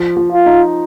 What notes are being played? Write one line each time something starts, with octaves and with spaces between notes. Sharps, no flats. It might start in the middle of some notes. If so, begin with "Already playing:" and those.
Already playing: F3
F3
F4
D#4